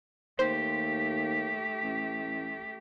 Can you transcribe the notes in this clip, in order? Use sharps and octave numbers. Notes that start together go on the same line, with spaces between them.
D#2 A3 G4 C5
A1